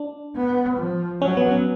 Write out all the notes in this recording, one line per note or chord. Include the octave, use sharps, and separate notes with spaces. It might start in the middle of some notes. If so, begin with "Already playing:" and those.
Already playing: D4
B3
F3
F#3 C#4
B3
C#4